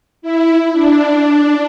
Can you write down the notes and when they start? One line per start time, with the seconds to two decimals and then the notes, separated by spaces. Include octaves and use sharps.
0.22 E4
0.73 D4